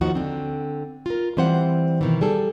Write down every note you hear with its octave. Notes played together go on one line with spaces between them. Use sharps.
D#2 F3 D#4 F#4 F#5
D3 C4
F4 A#4
E3 G3 C4 C5 F5 F#5
B2 D#3 E3
G3 G#4 A4